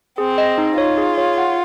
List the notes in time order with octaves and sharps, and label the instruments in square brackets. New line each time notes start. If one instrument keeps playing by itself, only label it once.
[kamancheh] C4 [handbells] G#4
[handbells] D#5
D#4
[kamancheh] F4 [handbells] C#5
[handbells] G#4
C#5
F#5